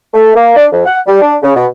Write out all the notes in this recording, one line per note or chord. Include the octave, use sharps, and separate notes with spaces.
A3
A#3
D4
F2
F#5
G3
D4
C#3
B2